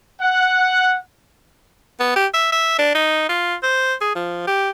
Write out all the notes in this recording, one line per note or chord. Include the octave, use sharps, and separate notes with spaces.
F#5
B3
G4
E5
E5
D4
D#4
F4
C5
G#4
F3
G4